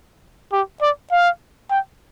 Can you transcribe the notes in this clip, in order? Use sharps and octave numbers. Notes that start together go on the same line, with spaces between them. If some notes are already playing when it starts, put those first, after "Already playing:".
G4
D5
F5
G5